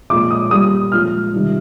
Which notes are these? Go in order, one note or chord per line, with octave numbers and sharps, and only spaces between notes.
A#2 F3 G#3 D6
D#6
A#2 G3 D#6
A#2 F3 G#3 F6
C3 D#3 G3